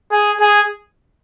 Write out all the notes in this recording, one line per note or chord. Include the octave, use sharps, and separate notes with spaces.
G#4
G#4